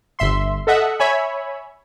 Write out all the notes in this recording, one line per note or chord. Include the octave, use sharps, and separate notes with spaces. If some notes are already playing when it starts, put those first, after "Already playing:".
G1 E5 C6
A4 D#5 E5 F#5
C#5 E5 G#5 B5